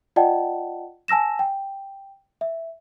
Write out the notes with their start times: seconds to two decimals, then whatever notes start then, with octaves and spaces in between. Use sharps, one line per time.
0.16 F4 D5 D#5 F#5 G5 A5
1.08 G#5 A5 E6 A#6 E7
1.39 G5
2.41 E5